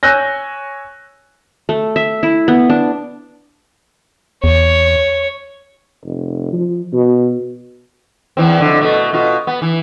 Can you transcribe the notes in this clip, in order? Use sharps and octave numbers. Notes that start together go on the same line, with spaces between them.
C#5 G#5 E6 F#6 G6 A#6
A3
E5
E4
B3
D4
E2 C#5
F1
F3
B2
E2 E3 C4
F2 B2 D3
B2 A3
B2 F4
B3
E3